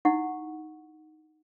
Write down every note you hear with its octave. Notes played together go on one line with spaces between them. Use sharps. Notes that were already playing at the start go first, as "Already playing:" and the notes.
D#4 E4 F#5 C#6